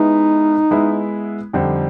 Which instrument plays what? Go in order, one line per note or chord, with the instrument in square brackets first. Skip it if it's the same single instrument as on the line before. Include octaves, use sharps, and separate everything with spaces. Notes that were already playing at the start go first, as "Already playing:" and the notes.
Already playing: [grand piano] G#3 B3 E4 [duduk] D#4
[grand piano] G#3 B3 E4
F2 D3 G3 C4 D#4